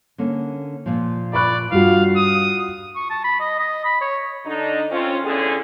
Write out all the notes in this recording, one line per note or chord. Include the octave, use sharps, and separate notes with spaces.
D3 A#3 C#4
A#2 F3
D5 B5 C#6 F#6
G2 G3 D4 F4 F#4 F5
D#6
C#6
A5
B5
D#5
D#5
B5
C#5
D3 D4 D#4
C4 C#4 F4
E2 A2 D3 C#4 G#4